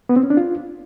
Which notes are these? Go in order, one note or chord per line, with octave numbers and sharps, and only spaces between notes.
B3
C4
C#4
D4
F4